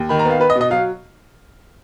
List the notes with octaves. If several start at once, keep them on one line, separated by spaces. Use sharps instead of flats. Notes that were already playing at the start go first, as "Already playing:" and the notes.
Already playing: D#2
D#3 B5
A#5
B3
F5
B3 B4
D#5
B2
D#5
F#3 F5